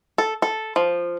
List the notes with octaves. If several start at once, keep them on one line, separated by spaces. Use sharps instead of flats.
A4
A4
F3